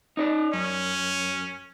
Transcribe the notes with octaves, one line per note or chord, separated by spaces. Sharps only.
D#4 C#5 D5
F#2 C#4